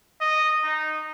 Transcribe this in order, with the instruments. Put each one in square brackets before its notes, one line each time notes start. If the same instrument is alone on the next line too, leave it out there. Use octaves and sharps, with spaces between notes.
[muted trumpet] D#5
D#4